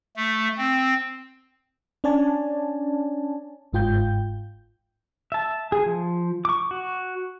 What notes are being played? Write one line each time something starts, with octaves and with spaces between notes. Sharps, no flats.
A3
C4
C#4 D4 C#5 D5 G#5 A5
G1 G#2 F4 G5 G6
E5 A5
G#4
F3
C#6 D6
F#4